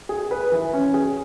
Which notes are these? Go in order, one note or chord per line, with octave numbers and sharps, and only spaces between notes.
G#4
B4
E3
C#4
G#4